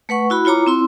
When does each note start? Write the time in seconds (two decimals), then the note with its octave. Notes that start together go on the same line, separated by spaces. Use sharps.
0.09 A3 B4 F#5 C#6
0.30 E4 F#4 B5
0.45 E4 F4 C#5 A#5 D6
0.67 C4 E4 C6